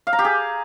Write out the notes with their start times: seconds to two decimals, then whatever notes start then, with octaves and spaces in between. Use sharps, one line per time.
0.07 F5
0.13 A#5
0.19 G4
0.25 G#4